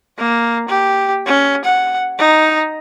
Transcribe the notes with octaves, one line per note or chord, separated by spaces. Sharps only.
A#3
G4
C#4
F#5
D#4